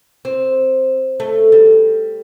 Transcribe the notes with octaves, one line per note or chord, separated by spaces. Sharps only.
C4
A3
G3